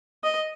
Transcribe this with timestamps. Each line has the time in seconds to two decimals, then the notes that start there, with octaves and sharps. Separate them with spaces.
0.24 D#5